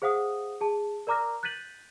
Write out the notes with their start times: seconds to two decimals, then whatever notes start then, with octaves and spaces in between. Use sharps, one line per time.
0.02 G#4 C5 F5 F#5 D#6
0.61 G#4 A5
1.07 A#4 D5 A#5 D6 F6 A#6
1.43 F#6 G6 A6 B6 D#7 F#7